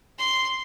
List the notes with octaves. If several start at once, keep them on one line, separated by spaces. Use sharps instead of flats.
C6